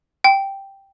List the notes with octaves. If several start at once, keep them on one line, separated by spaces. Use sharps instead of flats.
G5